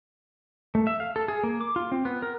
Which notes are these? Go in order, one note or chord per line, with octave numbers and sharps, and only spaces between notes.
A3
E5
F5
A4
G#4
A#3
D6
F4
C4
B3
A#4